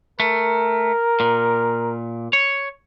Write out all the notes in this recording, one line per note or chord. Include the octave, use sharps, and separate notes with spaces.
A3 A#4
A#2
C#5